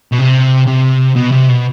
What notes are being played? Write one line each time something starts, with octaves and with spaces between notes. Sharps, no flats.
B2
C3
C3
B2
C3
B2